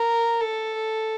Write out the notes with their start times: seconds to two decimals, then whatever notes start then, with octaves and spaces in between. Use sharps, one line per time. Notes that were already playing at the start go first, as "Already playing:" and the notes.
Already playing: A#4
0.41 A4